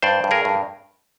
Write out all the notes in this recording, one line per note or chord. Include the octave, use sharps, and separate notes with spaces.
G2 C5 D5
G2
G#4 A#4
G2